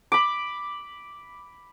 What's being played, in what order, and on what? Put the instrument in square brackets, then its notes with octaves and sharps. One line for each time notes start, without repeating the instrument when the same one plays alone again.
[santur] B5 D6